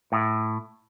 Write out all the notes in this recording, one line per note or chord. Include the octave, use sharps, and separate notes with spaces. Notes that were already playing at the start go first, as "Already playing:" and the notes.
A2